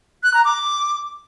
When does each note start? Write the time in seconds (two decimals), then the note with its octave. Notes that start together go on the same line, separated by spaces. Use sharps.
0.23 F#6
0.34 A#5
0.45 D6